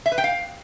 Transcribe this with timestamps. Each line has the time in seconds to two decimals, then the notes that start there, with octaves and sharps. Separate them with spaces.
0.06 E5
0.12 B4
0.18 G5
0.24 F5